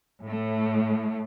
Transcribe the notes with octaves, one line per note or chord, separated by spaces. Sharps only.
A2 A3